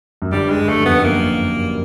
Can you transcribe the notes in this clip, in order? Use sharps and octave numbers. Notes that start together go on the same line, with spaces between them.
F#2
G1 G2 G3
G#3
G1 G2
A3
F#2
F2 B3
F#2
A#3